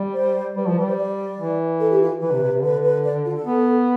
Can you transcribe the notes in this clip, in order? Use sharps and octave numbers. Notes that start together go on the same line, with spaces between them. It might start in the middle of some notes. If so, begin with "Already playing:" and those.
Already playing: G3
C5
G3 B4
F3 F4
G3 B4
C5
D5
E3
A4
G4
F4
E3 B4
C3
C3
C3
D3 B4
B4
D5
F4
A4
B3